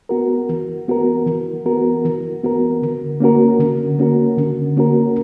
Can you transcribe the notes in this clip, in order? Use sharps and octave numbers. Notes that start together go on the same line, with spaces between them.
B3 F#4 A#4
E3
B3 F#4 A#4
E3
B3 F#4 A#4
E3
B3 F#4 A#4
D3
A#3 C#4 F#4 A#4
D3
A#3 C#4 F#4 A#4
D3
A#3 C#4 F#4 A#4